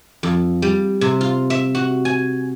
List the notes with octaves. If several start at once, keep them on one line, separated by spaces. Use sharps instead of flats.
F2
G3
C3
F4
E5
F#4
G#5